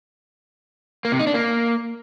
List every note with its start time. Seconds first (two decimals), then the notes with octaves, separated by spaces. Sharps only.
1.05 A#3
1.12 C3
1.19 D#4
1.27 D4
1.34 A#3